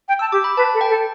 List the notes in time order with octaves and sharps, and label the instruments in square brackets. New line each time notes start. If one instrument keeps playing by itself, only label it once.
[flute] G5
[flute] A5 [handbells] E6
[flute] G4 [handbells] D6
[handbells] B5
[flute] B4 [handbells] A5
[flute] A4
[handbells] G5
[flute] A4